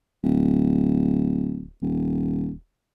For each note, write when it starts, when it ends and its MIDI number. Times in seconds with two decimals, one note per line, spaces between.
0.24 1.68 26
1.82 2.53 27